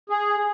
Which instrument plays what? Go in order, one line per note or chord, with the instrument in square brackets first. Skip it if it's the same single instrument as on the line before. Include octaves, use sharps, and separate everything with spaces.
[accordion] G#4